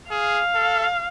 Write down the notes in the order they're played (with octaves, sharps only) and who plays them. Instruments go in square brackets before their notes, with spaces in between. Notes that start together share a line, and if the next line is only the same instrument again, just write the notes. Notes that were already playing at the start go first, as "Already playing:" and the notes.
[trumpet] G#4 [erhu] F5
[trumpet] A4